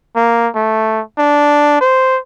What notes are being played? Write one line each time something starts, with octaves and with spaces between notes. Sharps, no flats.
A#3
A3
D4
C5